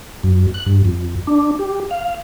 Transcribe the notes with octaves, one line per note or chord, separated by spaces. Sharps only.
F#2
F#6
G2
F2
D4
G4
F5